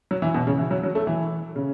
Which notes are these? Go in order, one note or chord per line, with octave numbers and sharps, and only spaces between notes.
F#3
E3
B2
C#3
E3
F#3
F#3
A3
E3
C#3